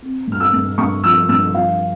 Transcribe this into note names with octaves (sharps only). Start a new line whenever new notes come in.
C4
G2 F6
E6
G2
G2 C#6
F3 E6
G2 E6
F3 F5